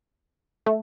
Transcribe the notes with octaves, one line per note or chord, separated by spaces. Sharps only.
A3